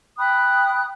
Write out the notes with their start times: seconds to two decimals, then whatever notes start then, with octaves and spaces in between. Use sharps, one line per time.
0.18 G5 B5 D#6 F#6